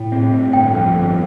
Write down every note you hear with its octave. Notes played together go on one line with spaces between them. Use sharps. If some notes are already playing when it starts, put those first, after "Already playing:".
Already playing: A2 G5
C4
A2
G1 G5
F2
G1